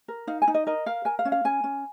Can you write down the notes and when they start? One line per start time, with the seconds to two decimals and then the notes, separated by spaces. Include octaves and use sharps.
0.08 A#4
0.27 D#4 F5
0.42 G#5
0.48 D#4
0.54 D#5
0.67 A#4 D#5
0.86 A#4 F5
1.05 A#4 G#5
1.19 F5
1.25 C#4
1.32 F5
1.45 C#4 G#5
1.64 C#4